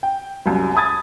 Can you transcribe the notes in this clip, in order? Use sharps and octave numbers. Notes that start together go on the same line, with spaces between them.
G5
C2 F#2
A5 B5 D#6 G#6 A6